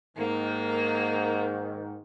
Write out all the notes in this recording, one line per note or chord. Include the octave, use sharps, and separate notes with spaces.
G#2 D#3 A#3